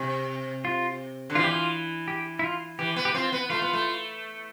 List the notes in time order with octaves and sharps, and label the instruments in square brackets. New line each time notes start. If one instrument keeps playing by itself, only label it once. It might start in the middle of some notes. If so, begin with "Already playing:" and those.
Already playing: [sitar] C3
[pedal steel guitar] F4
[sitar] D3
[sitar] E3 [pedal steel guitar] F4
[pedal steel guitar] G4
F4
G4
E4
F4
[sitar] E3 [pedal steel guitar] G4
[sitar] B3
[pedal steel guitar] G4
[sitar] C4 [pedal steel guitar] F4
[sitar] B3
[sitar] A3 [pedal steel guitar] F4
[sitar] B3
A3